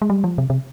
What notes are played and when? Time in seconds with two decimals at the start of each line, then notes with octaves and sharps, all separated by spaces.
0.02 G#3
0.10 G3
0.24 F3
0.38 C3
0.50 C3